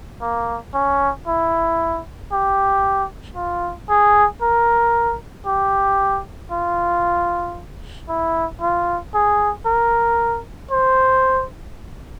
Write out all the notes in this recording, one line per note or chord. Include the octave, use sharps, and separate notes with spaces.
A#3
C#4
E4
G4
F4
G#4
A#4
G4
F4
E4
F4
G#4
A#4
C5